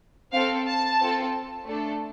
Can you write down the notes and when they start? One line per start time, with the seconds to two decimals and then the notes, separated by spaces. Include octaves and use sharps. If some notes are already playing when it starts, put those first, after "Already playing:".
0.33 C4 A4 F5
0.67 A5
0.99 C4 F4 A4
1.66 A3 D4 A4